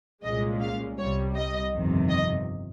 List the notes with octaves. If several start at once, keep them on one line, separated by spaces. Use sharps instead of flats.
C2 A#2 G#3 C#4 D#5
F5
C2 C3 G3 C#5
D#5
G1 F2 C3 D#3
D#5